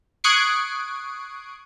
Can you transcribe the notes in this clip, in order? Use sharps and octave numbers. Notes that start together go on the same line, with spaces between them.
C#6 D#6 F#6 G#6 C7 D7